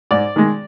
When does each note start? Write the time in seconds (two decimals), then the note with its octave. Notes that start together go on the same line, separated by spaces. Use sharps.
0.11 G#2 D5
0.36 D#3 G#3